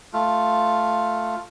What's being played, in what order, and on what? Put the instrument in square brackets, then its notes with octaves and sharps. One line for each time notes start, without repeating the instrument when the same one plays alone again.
[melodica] A3 F4